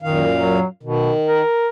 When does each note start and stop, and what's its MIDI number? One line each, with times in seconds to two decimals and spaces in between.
0.02 0.59 42
0.02 0.59 46
0.02 0.24 51
0.02 0.59 77
0.34 0.65 54
0.83 1.11 47
0.83 1.42 51
1.27 1.68 70